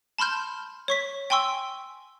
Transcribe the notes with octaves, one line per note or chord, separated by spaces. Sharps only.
A5 B5 C6 F6 G6
C#5 C#6 B6
G5 G#5 C6 C#6 E6